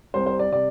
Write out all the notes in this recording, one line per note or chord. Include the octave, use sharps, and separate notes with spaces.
C2 C3 G3 C5
C5
D5
C3 G3 D5